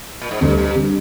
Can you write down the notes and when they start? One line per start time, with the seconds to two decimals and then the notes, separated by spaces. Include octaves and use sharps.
0.22 A#2
0.31 G#2
0.41 D2 G2 D3 G3
0.57 G2
0.75 D3 G3